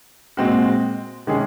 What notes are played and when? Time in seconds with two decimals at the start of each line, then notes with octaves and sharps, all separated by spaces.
0.37 A#2 G#3 C4 F#4
1.27 C3 D#3 G#3 C#4 G#4